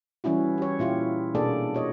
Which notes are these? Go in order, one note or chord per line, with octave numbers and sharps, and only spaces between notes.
E3 G3 C#4 E4 F#4
G4 C#5
A#2 E4 F4 G4
B2 A#3 D4 G#4 A4 D5
F#4 C#5 D#5